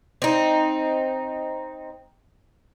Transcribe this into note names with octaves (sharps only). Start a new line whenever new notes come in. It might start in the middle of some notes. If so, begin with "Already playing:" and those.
C4 D#4